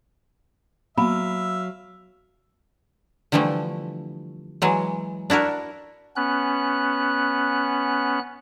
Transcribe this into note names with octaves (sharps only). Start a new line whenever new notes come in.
F#3 A#3 B3 E5 F5 B5
D3 E3 F3 G3 A3
E3 F#3 G#3
D4 E4 F#4 A#4
B3 C#4 F#6